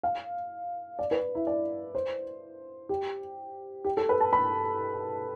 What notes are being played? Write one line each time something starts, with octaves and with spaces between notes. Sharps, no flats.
F5
D5
B4
E4
D5
C5
G4
G4
A4
B4
A5
B5